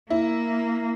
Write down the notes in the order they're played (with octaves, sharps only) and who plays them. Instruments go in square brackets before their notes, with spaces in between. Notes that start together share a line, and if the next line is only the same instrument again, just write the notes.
[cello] A#3 [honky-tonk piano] E4